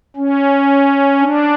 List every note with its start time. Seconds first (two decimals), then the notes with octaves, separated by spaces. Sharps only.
0.16 C#4
1.20 D4